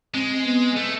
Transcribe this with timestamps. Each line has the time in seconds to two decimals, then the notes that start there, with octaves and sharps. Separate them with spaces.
0.14 G#3 C4
0.46 B3
0.77 A3